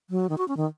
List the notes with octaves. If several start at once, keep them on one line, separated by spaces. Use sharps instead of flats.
F#3
D#3
F#4
C#4
D#3